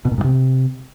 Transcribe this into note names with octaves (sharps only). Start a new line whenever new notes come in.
B2
A#2
G#2
C3